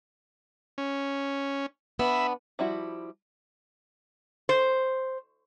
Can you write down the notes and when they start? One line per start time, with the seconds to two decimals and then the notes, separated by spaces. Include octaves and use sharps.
0.78 C#4
1.99 B3 D4 E5 B5
2.59 F3 G3 E4 F#4
4.49 C5